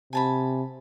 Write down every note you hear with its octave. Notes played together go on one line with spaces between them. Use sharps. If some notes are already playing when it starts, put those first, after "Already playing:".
C3 G#5 A5 B5